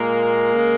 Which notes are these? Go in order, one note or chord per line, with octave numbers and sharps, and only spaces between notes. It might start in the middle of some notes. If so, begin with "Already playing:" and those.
Already playing: A#2 G#3 A#3
C#3 G#3